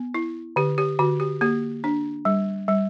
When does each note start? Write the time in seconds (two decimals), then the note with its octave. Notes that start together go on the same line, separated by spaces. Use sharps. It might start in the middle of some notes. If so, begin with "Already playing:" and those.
Already playing: B3
0.14 E4
0.56 D3 G4
0.78 G4
0.99 D3 F#4
1.20 G4
1.41 A#3 G4
1.84 D4
2.25 G3
2.68 G3